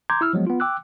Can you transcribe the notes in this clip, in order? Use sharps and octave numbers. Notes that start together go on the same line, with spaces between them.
A#5 C6 D6 G6 G#6
E4 E6 F6
F3 F#3 G#3 B3
B3 F4
G5 D6 E6 F#6